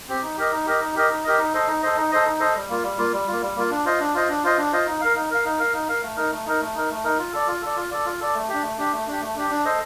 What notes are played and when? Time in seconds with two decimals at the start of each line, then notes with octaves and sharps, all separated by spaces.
0.08 C4 G4
0.22 D#4
0.37 G4 A#4 D#5
0.52 D#4
0.66 G4 A#4 D#5
0.81 D#4
0.95 G4 A#4 D#5
1.09 D#4
1.24 G4 A#4 D#5
1.38 D#4
1.54 A4 C5 D#5
1.67 D#4
1.82 A4 C5 D#5
1.97 D#4
2.11 A4 C5 D#5
2.26 D#4
2.40 A4 C5 D#5
2.55 G3
2.69 A#3 F4
2.83 G3
2.98 A#3 F4
3.13 G3
3.27 A#3 F4
3.42 G3
3.56 A#3 F4
3.70 D4
3.85 F4 C5 D#5
4.00 D4
4.14 F4 C5 D#5
4.29 D4
4.43 F4 C5 D#5
4.58 D4
4.72 F4 C5 D#5
4.87 D#4
5.01 A#4 F5
5.15 D#4
5.31 A#4 F5
5.45 D#4
5.59 A#4 F5
5.73 D#4
5.88 A#4 F5
6.02 A3
6.16 D#4 A#4
6.31 A3
6.46 D#4 A#4
6.61 A3
6.75 D#4 A#4
6.90 A3
7.04 D#4 A#4
7.18 F4
7.33 A4 D5
7.48 F4
7.62 A4 D5
7.76 F4
7.91 A4 D5
8.05 F4
8.20 A4 D5
8.34 A3
8.48 D4 G4
8.63 A3
8.78 D4 G4
8.92 A3
9.07 D4 G4
9.21 A3
9.36 D4 G4
9.51 D4
9.65 A4 C5 D#5